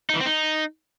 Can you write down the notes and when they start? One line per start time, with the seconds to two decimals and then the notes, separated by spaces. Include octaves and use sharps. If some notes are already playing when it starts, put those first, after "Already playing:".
0.09 D#4
0.15 E3
0.20 C4
0.26 D#4